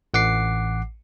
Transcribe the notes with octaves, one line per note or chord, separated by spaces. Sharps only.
A1 F#5 D6 C7